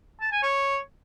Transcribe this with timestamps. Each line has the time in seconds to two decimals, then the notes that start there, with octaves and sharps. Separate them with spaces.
0.21 A5
0.32 G#5
0.43 C#5